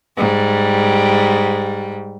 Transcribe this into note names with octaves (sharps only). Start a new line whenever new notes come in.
G#2 G3